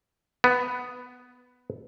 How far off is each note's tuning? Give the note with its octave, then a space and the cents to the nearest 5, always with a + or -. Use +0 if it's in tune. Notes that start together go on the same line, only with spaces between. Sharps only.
B3 +5